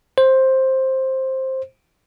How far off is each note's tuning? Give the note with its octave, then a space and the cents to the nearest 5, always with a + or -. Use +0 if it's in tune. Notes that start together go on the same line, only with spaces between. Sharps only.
C5 +10